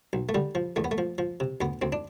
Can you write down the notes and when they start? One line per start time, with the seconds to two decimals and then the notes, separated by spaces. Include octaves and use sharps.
0.13 B1
0.29 A3
0.35 D3 G3
0.55 F3
0.76 E2 A3
0.84 B3
0.91 A3
0.98 F3
1.18 F3
1.40 C3
1.61 D2 B3
1.82 D2 C4
1.92 D4